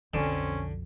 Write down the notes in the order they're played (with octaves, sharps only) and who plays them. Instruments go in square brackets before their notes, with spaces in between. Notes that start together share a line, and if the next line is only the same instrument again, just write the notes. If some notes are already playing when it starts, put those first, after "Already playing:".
[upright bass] B1 F2 [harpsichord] D3 [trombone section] C4 C#4